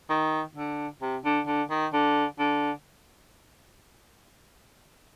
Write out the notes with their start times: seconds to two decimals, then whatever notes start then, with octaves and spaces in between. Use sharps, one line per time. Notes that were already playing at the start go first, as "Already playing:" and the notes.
0.10 D#3
0.56 D3
1.02 C3
1.25 D3
1.47 D3
1.70 D#3
1.93 D3
2.39 D3